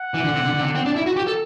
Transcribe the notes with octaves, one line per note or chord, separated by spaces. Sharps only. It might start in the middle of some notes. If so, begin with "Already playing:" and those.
Already playing: F#5
E3
D3
C3
D3
D3
C3
D3
C4
D4
E4
F#4
G4
A4